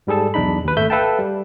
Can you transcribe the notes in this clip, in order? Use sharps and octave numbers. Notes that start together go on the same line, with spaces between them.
G#2 G3 G#4 A4 A5
B1 E2 D4 D#4 B5
D#2 B4
G#1 A3 E5 G6
A4 B4 E5 F5 G5 A5
G3